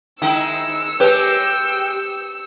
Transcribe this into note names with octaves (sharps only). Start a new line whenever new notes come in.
D#3 G#3 D#4 E4 E6 C#7
G#3 G4 B4 C#5 G5